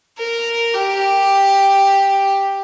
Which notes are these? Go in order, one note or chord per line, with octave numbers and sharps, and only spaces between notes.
A#4
G4